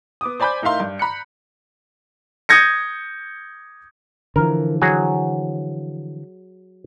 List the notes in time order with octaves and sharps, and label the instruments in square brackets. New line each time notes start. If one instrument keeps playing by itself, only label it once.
[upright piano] B3 D6 D#6
C5 D5 G#5 B5 D6 G6
A2 D#4 A#4 E5 F5 C6
G2
A#5 B5 F#6 C#7
[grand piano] D#6 G6 G#6 A#6 C#7
[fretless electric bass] D3 E3 F3 [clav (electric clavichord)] A#4
[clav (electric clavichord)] F#3 F#4 G#4